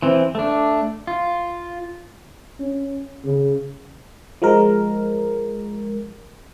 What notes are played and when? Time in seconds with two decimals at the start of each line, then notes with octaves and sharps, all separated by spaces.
0.02 E3 C4
0.35 A3 D4
1.07 F4
2.60 C#4
3.24 C#3
4.42 F3 G#3 A#4